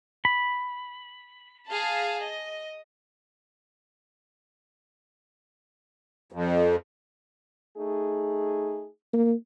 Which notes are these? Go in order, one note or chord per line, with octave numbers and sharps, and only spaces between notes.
B5
G#4 F5 A5
D#5
F2
A3 D#4 G#4
A#3